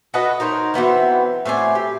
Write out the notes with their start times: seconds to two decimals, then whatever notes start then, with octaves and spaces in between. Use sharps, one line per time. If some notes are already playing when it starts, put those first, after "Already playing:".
0.14 F#4 A4 B4 D#5
0.40 D#4 A#4 C5 C#5
0.74 E3 F#3 B3 C4
1.45 A2 C4 D5 G#5
1.75 G4